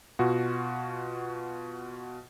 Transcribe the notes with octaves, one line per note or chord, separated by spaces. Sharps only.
B2 F4 F#4